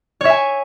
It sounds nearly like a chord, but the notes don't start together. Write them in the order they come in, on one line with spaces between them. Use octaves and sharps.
C#5 E5 G#5